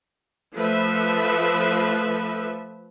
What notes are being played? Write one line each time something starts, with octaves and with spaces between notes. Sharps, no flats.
F3 A3 A4 B4 E5